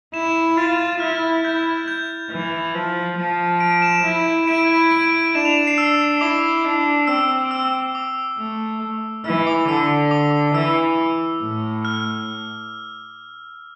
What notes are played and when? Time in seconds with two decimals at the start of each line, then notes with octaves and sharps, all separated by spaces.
0.14 E4 E7
0.57 F4 A6
1.00 E4 F6
1.44 E4 G6
1.88 G6
2.31 E3
2.75 F3
3.17 F3
3.60 D7
3.82 E7
4.04 E4
4.47 E4 D7
4.91 D7
5.35 D4 E7
5.45 F7
5.57 E7
5.67 C7
5.78 E6
6.21 E4 D6
6.65 D4
7.07 C4 E6
7.51 E6
7.95 D6
8.38 A3
9.24 E3 E6
9.47 D6
9.68 D3 E6
10.11 D6
10.54 E3 E6
11.41 A2
11.85 F6